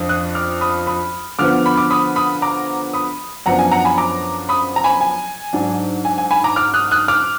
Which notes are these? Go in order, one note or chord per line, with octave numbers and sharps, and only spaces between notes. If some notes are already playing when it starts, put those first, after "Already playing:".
Already playing: F2 F3 D4
D#6 F#6
D6 F6
B5 D#6
B5 D#6
D3 F3 B3 D6 F6
B5
D6
B5 D#6
B5 D#6
A#5 D6
B5 D#6
F#2 F3 B3 D4 F#5 A#5
G#5
F#5 A#5
G#5 B5
A#5 D6
B5 D#6
A#5
G#5 B5
G#5
G#2 F#3 D4
G#5
G#5
G#5 B5
A#5 D6
D6 F6
D#6 F#6
D#6 F#6
D6 F6